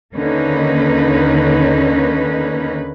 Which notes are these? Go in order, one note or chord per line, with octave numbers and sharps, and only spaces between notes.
D#2 D3 A#3 C#4 D#4 B4